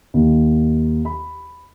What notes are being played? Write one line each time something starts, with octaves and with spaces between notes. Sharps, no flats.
D#2
B5